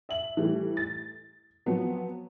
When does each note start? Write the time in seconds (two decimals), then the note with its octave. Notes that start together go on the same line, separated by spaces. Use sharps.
0.09 E5 F#7
0.37 E3 G3 A3
0.77 A6
1.66 F3 F#3 B3 C4